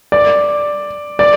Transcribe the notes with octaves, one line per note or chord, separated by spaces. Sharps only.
D5
D5